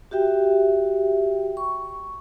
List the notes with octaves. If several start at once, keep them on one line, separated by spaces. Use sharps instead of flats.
F#4 G4 E5 G5
C#6